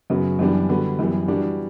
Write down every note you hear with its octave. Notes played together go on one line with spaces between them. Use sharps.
F#2 C#3 F#3 B3 F#4
F#2 E3 G3 B3 D4
D3 G3 B3 F#4
F#2 E3 G3 B3
E3 G3 D4 F#4